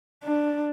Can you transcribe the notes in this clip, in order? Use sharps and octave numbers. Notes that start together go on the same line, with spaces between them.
D4